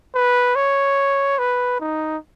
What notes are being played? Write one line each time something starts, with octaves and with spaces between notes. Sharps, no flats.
B4
C#5
B4
D#4